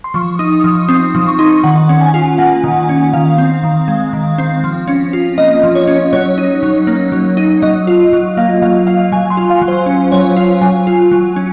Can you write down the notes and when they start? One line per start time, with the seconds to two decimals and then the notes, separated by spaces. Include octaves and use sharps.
0.04 C6
0.14 F3 C#6
0.39 D#4 D#6
0.64 F3 D#6
0.89 C4 D#6
1.15 F3
1.27 C#6
1.39 D#4 C6
1.50 C#6
1.64 D#3 F#5
1.89 C#4
2.01 G#5
2.14 F4
2.38 A#3 F#5
2.64 D#3
2.89 C#4
3.13 D#3 F5
3.38 C4
3.64 D#3
3.88 G#3
4.13 D#3
4.38 C4
4.64 F3
4.88 C#4
5.13 F4
5.38 A#3 D#5
5.63 F3
5.75 C#5
5.87 C#4
6.13 F#3 C#5
6.38 D#4
6.63 F#3
6.87 A#3
7.12 F#3
7.37 D#4
7.62 F#3 D#5
7.87 F4
8.13 F#3
8.37 A#3 F5
8.62 F#3 F5
8.87 F4 F5
9.12 F#3 G#5
9.30 C6
9.37 F4
9.50 F5
9.62 F#3
9.68 C5
9.86 C#4
10.12 F#3 C#5
10.36 F4 F5
10.61 F#3 G#5
10.87 F4
11.11 F#3
11.36 C#4